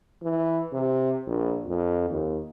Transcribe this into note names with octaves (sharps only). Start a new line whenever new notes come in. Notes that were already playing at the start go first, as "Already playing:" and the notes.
E3
C3
A#1
F2
D#2